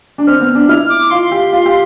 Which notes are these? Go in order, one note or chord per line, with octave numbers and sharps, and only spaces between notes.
D4
C4 F6
B3
D4
E4 F6
D6
F4 C6
G4
F4
G4